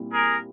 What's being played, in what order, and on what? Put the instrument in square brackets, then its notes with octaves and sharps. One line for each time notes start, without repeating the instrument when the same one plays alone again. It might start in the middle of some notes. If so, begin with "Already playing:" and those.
Already playing: [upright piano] A#2 G3 C4 E4
[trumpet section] G#4 A#4